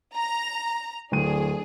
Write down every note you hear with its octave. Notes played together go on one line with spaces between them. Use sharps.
A#5
D1 D4 G#4 D#7